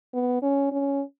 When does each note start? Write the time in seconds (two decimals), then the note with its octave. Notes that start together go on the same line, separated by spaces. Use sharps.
0.14 B3
0.42 C#4
0.72 C#4